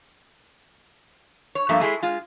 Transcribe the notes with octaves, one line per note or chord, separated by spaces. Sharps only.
C#5
G2 F3 A3 A#3 E5
G#3 E4 G#4 A4
G#3 F4